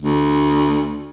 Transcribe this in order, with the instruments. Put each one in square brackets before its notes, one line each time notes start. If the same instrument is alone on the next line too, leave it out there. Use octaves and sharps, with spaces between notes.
[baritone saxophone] D2